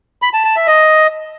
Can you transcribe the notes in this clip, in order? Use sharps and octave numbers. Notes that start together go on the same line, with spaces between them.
B5
A5
A5
E5
D#5